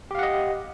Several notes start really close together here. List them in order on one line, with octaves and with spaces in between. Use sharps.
G4 F5 F#5 D#5